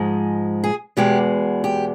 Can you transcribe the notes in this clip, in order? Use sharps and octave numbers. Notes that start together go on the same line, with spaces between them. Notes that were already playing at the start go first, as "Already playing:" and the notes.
Already playing: G#2 F3 G#3
G#4
E2 B2 G#3 G4
G4